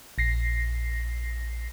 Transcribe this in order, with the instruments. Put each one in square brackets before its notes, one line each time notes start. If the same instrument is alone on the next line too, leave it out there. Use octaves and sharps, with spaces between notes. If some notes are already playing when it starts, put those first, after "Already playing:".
[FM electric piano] A#1 A#6 C7